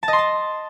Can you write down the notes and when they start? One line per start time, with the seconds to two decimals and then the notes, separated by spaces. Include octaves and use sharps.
0.03 A5
0.08 D#5
0.13 C6
0.18 A5